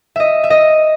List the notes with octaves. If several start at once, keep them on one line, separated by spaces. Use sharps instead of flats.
D#5 E5
E5
D#5